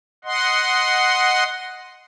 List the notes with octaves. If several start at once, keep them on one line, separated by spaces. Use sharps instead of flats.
D#5 F#5 C6